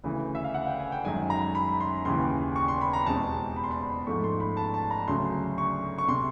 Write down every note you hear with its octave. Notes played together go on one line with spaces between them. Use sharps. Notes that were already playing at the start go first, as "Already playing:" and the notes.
D2 C#3 E3
E5
F5
F#5
G5
G#5
G5
F#2 D#3 G#3 G#5
A#5
B5
C6
D#2 C#3 E3 C6
C#6
C6
B5
A#5
E2 B2 G#3 C4 A5
B5
C6
B5
G#2 F3 A3 C#6
C6
B5
A5
A5
A#5
D2 C#3 F#3 C6
C#6
C#6
C3 C6